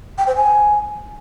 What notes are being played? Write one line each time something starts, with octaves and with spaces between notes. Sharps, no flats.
G5
C5
G#5